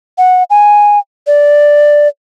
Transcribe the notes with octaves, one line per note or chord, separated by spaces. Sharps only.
F#5
G#5
D5